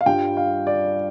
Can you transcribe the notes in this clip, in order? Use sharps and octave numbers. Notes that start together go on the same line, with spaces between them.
F5
G2 G3 F4 G5
F5
D5